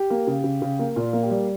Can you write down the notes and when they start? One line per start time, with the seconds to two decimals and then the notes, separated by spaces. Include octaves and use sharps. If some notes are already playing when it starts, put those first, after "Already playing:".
Already playing: G4
0.10 A#3
0.27 C#3
0.44 C#3
0.62 C#3
0.79 A#3
0.96 A#2 F4
1.13 A#3
1.23 G4
1.30 G3